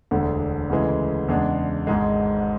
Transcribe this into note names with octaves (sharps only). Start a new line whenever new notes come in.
E1 D2 D3
D2 C#3 E3 G#3
E2 C#3 G#3 D4
G#1 G#2 G#3